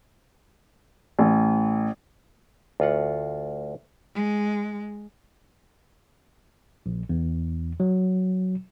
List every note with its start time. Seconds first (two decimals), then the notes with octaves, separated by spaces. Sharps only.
1.19 A1
2.80 D2 F4 F#5
4.15 G#3
6.86 A#1
7.09 E2
7.80 F#3